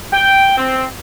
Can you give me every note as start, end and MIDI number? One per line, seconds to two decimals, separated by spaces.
0.13 0.54 79
0.57 0.85 60